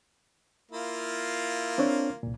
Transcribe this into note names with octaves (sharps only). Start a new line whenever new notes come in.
A#3 E4 F4
C4 D4 C#5
C2 A#2